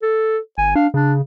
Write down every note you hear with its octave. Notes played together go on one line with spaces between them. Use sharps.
A4
G1 G#5
D4 F5
C#3 D4